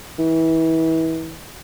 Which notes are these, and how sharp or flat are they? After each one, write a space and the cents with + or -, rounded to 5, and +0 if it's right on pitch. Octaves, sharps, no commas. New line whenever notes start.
E3 -30